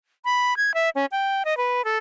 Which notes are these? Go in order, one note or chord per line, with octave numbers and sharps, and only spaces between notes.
B5
G#6
E5
C#4
G5
D#5
B4
A4